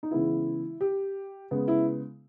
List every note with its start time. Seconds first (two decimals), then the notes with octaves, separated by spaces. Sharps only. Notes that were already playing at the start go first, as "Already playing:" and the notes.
0.03 D#4
0.11 C#3 E3 G#3 B3 E4
0.81 G4
1.51 C#3 G#3 B3
1.68 E4